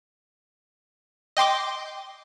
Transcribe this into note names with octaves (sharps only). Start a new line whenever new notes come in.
D#5 G5 C6 D6